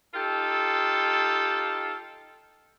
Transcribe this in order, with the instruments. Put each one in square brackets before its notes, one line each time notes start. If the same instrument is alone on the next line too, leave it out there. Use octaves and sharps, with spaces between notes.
[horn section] D#4 F4 G4 A4